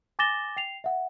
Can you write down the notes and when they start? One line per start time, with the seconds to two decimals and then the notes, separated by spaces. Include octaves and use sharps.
0.19 G#5 D6 A6 A#6 E7 G7
0.57 G5 C7 F7
0.84 E5 F#5